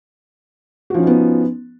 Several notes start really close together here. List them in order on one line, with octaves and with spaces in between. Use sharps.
F#4 F3 C#4 D#4 B3